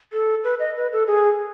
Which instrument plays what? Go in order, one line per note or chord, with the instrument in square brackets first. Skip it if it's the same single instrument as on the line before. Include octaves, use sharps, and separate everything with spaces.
[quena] A4
B4
D#5
B4
A4
G#4